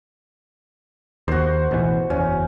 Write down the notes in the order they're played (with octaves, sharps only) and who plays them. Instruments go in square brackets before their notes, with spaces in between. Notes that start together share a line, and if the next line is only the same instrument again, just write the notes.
[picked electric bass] D#2 [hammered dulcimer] F#4 C5
[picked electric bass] A1 B2 E3
[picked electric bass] F#1 E2 [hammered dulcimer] C#4